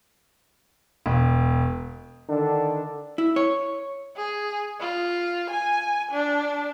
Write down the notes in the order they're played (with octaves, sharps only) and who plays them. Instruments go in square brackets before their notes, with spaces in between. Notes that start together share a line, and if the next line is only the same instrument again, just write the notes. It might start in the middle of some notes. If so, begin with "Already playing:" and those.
[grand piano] E1
[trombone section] D3 D#3 D4 A4
[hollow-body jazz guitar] E4
C#5
[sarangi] G#4
F4
G#5
D4